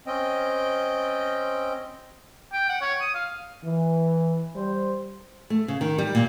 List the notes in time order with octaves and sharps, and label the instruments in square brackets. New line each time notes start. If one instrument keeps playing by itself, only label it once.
[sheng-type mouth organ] C4 C#4 D#5 G5
[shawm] G5
F#5
C#5
D#6
F5
[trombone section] E3
G3 C5
[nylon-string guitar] A3
C#3
D#3
G3
A#2